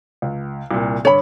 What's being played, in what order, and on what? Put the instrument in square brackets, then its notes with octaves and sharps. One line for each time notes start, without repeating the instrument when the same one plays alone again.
[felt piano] C#2
C2 A#2
[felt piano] G2 D3 [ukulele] C#5 B5